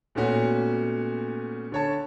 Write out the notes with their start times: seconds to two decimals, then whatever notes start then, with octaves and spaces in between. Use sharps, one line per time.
0.15 A#2 A3 B3 C#4 F#4
1.72 D3 C#5 A5